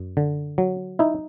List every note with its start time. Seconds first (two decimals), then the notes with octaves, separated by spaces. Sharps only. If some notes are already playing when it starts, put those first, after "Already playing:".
Already playing: F#2
0.17 D3
0.58 F#3
0.99 D#4 E4